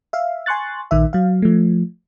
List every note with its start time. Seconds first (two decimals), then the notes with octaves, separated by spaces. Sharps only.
0.13 E5 F5
0.46 G#5 C6 C#6 F#6 A6
0.91 A#1 D#3 E5
1.13 F#3 F5
1.42 F3 A3